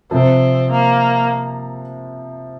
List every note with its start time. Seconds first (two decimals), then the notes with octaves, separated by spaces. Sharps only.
0.11 C3 F3 C4
0.72 A#3